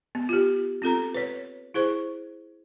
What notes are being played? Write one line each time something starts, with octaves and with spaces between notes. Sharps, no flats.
B3
F4 G4
C4 F4 A4 A#5
B4 C#5
E4 G#4 C5 C#6